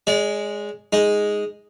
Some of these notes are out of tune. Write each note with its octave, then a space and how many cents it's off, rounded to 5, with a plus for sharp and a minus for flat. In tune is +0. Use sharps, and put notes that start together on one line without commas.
G#3 +0 D5 -40
G#3 +0 D#4 +0